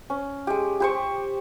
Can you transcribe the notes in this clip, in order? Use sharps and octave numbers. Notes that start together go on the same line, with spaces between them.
C#4
G#3 G4
G4 C5 C#6